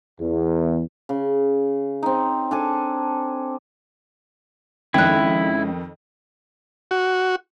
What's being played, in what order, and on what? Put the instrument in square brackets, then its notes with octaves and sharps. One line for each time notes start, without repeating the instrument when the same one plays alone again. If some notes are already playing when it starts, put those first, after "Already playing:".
[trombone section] E2
[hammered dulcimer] C#3
C4 D#4
D4 A4 G#5
[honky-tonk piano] F2 D#3 [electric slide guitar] G#3 C#4 [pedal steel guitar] E4 [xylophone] G5 F#6
[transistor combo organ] F#4